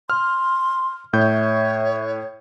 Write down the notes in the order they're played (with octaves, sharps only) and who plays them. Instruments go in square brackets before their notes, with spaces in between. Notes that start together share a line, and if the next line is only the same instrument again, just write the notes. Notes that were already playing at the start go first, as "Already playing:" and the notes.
[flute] C6 [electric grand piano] F6
[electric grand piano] A2 G6 [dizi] C#5 [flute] E5